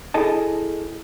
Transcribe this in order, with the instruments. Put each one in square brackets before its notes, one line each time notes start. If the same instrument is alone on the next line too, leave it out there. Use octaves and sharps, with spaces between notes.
[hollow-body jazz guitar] E4 G#4 A4 D#5 A5